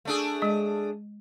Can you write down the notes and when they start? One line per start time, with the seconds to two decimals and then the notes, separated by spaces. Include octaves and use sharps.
0.05 A3 D4 G#4
0.42 G#3 D#5